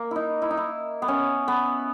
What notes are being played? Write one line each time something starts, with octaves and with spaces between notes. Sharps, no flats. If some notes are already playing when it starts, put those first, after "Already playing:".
Already playing: A#3
D#4 E4
E4
D#4
E4
B3
C#4
B3